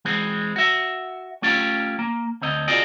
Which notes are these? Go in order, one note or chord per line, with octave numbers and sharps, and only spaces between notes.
E3 G#3 C4
F#4 E5
A3 C#4 F4 G4
A#3
D2 C4 D#5
F4 F#4 G#4 D5 D#5